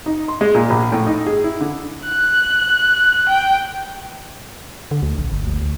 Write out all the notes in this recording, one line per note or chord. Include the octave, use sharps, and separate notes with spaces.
D#4
C6
G#3
A#2
A#1
A2
D#4
G#4
E4
D3
F#6
G5
D3
D2
A#1
G1
D2
D2